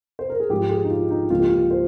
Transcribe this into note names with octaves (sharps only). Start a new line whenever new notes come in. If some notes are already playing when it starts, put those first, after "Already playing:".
C5
A#4
G#4
G#2 F3 G#3 G4
G#4
D#4
F4
D#4
C#2 C#3 F3 A#3 F4
G4
F4
C5